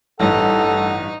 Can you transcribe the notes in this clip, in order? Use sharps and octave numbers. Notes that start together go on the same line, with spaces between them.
A1 G2 D#4 A4 F#5